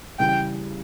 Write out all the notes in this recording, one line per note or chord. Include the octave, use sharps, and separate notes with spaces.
C#3 E3 G3 G5